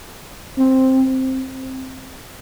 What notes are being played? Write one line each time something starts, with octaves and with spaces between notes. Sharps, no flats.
C4